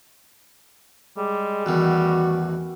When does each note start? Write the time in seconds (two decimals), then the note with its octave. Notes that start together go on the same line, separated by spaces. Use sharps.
1.17 G3 G#3
1.66 A1 E2 D#3 F#4